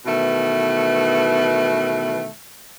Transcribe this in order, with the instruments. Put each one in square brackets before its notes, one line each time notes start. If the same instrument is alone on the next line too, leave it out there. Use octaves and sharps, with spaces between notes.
[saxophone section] B2 D#3 E3 A3